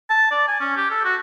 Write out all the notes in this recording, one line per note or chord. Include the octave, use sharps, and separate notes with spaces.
A5
D5
G#5
C#4
G4
A4
F#4